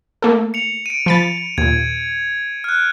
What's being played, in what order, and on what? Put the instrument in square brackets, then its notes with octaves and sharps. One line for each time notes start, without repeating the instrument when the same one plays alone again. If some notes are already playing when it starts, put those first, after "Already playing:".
[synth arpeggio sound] A3 A#3 A4
[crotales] C#7 F7
D7 D#7
[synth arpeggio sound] F3 B5 A6
[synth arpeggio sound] D#2 A#2 [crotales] G#6
[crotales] F6 F#6